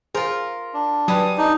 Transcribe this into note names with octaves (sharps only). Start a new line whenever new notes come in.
F4 G#4 A#4 C5
D4
F#3 G3 G#4 B4 D#6
D4 D#4